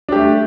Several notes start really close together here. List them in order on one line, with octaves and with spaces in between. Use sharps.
D4 G4 A3